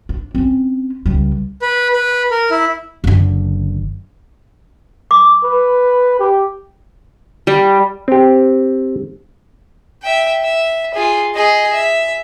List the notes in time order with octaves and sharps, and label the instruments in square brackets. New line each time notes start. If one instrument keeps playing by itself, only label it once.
[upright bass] D4
C4 C#4
C#2 G3
[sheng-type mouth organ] B4
B4
A#4
E4
[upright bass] F#1 D3
[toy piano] D6
[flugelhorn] B4
G4
[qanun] G3
[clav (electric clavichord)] C4 G4
[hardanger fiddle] E5 G5
E5
F4 G#4
G#4 D#5
E5